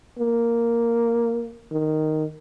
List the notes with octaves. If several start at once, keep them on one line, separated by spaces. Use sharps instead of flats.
A#3
D#3